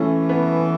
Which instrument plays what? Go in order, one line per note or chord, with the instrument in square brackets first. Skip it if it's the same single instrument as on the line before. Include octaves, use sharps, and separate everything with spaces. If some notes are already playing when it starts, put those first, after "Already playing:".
Already playing: [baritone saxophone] E3 [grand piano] A3 C#4
[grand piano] B3